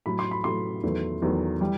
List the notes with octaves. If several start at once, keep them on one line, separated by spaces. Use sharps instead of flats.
A2 F#3 A3 B5
C6
B5
A2 F#3 A3 C6
E2 D#3 F#3 A3
E2 D#3 F#3 A3
E3 G3